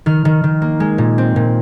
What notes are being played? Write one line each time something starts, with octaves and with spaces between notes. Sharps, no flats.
D#3 F6
D#3
D#3
A#3
G#3
A#2
C4
A#2